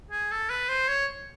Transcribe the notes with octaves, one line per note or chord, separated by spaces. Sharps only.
G#4
A4
B4
C5
C#5